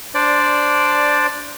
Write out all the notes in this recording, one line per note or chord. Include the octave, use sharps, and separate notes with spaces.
D4 C5 D5